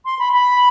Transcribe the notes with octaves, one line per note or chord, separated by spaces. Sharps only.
C6
B5
B5